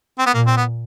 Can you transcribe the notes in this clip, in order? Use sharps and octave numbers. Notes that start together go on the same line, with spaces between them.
C4
B3
A#2 A#3
C4
B3